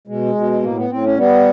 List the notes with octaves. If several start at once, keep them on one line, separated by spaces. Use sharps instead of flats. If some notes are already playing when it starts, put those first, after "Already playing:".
B2 G#3
B2
A2 A#3
B3
A2 C4
C#4
G3 B3